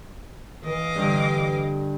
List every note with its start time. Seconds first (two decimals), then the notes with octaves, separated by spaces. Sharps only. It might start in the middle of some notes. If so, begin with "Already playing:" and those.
0.65 E3 D#5 F5 D6
0.95 G2 D3